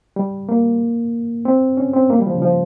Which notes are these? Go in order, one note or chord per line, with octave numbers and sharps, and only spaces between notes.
G3
A#3
C4
C#4
C4
A#3
G3
F3
C#3
F3